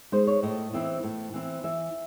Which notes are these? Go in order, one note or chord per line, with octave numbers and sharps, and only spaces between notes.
G#3 D#4 C5
C#5
A2 D#5
E3 C4 E4
A2
E3 C4 E4
E3 E5